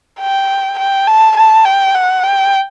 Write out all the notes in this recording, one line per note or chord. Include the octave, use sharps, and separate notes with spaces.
G5
G5
A5
A5
G5
F#5
G5